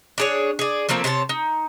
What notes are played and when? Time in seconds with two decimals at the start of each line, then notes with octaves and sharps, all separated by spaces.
0.18 D4 G#4 C#5
0.59 G#4 D5
0.89 F3 A3 A#3 C4
1.04 C3 C5 C#5 A5
1.29 D#4